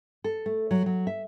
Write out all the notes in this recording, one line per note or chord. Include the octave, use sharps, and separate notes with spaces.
A4
A3
F#3
F#3
E5